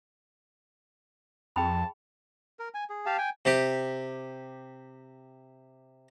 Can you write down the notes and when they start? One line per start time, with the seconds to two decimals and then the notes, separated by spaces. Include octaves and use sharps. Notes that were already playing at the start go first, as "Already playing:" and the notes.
1.56 F2 G#4 G5 A5 B5
2.59 A#4
2.74 G#5
2.90 G#4
3.06 G4 F5 A5
3.18 G5 G#5
3.45 C3 G4